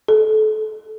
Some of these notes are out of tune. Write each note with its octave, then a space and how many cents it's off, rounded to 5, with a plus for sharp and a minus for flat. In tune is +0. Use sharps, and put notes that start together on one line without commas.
A4 -30